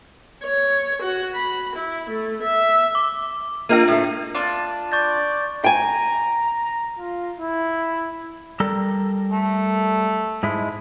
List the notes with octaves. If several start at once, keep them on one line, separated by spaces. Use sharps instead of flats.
C#5
F#4
B5
E4
A3
E5
D6
A#3 D4 F4 A#4 D#5 D#7
A2 A3
D4 F4
D5 C#6 G6 A6
G5 G#5 A#5
F4
E4
G3 A4 A#4
A3
G#2 G#3 E4